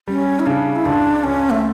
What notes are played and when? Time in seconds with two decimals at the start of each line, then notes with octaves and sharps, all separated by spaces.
0.08 G3 C#4
0.40 E4
0.46 C#3 D4
0.76 E4
0.85 C#2 D4
1.24 C#2 C#4
1.50 A3